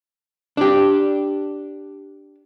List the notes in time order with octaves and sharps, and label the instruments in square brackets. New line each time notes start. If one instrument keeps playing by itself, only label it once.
[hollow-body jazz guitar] D4 G4